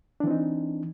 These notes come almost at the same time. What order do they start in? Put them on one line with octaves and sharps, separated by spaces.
D4 E3 C4 D#4